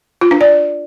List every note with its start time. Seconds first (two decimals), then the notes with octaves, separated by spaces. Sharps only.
0.21 F4
0.31 D4
0.41 D5